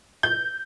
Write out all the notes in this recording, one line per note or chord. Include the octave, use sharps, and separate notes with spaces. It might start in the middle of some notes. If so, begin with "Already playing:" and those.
G6